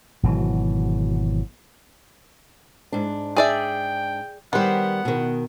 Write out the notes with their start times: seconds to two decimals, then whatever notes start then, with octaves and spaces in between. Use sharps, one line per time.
0.23 G#1 B2 E3 F#3
2.92 G#2 D4
3.37 G#4 D5 E5 G5
4.53 D#3 G3 B3 C5 F#5
5.05 B2 D#3